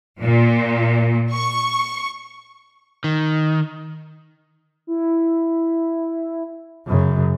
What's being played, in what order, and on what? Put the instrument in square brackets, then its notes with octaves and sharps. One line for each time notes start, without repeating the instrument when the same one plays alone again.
[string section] A#2
C#6
[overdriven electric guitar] D#3
[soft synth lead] E4
[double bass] F#2 C#3